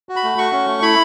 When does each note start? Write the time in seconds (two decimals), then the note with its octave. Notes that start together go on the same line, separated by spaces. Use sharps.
0.09 F#4
0.16 B5
0.24 A3
0.38 F#4 C#6
0.52 C#4
0.67 A3
0.82 E4 B5